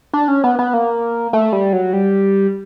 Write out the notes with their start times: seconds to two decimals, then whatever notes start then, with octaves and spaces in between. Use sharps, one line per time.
0.13 D4
0.28 C#4
0.44 B3
0.59 B3
0.74 A#3
1.33 A3
1.53 G3
1.73 F#3
1.93 G3